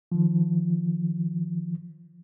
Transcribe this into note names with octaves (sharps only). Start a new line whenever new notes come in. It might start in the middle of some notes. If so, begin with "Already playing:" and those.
D#3 F3